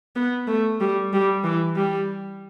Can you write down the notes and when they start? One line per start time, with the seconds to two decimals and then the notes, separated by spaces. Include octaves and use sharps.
0.16 B3
0.47 A3
0.81 G3
1.13 G3
1.44 E3
1.76 G3